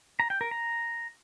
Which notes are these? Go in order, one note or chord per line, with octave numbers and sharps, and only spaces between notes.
A#5
G5
A#4
A#5